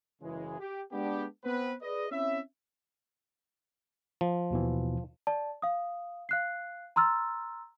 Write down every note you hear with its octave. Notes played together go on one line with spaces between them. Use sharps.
F#1 C#3 E3 G#3
G4
G#3 B3 D4 G4
B3 C4 B4
G#4 B4 D5 D#5
C4 C#4 E4 C#5 E5
F3
D#2 B2 E3
D5 A5
F5 D#6
F5 F#6 C7
A#5 C6 E6 F6 A6